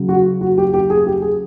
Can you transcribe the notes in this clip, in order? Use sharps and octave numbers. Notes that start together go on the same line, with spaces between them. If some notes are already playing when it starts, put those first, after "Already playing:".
Already playing: C#3 F#3
F#4
F#4
G4
G4
G#4
G4
G#4